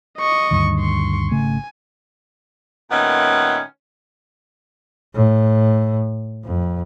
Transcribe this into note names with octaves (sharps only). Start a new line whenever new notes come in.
D#5 C#6
D2 G2 D#3
C6 C#6
G#1 C#3 A3 G#5
A#2 D#3 A3 B3 C#4
A2
F2